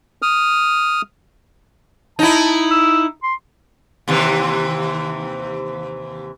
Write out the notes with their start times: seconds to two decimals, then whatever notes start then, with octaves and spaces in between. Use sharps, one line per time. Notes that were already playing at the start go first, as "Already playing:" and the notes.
0.22 D#6 F6
2.19 D#4 E4 A5
2.71 E6
3.23 C6
4.08 D#2 C3 E3